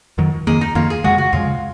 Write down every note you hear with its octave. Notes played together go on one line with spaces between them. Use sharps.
F2 D#3 F#3
F2 D#3 A#3 G#4
D#4
F2 D#3 A#3 F4
G#4
F2 C#3 G#3 F#4
F#4
F2 C#3 G#3 F4